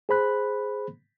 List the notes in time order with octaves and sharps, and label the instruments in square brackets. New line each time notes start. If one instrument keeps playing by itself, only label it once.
[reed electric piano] G#4 C5 B5 F#6